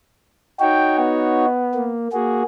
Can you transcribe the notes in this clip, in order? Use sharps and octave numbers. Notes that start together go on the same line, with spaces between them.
D#4 F#4 C#5 G5
B3
A#3
A#3 F#4 G#4